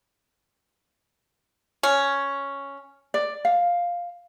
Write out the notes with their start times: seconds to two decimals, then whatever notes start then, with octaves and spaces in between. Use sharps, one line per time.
1.83 C#4
3.14 D5
3.45 F5